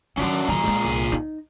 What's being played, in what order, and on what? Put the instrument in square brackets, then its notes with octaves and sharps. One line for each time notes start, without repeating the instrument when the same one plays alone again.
[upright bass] D#3 F#3 [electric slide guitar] C#4 D4 F#4
[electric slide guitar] A#2 G#4 A#5 [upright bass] D#3 F#3
[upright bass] G#3 F4
C2
D#4